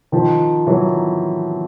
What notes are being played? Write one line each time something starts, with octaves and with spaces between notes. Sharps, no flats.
D#3 F3
E3 F#3